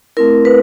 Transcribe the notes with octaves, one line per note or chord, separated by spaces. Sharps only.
A3 C4 E4 A#4
B4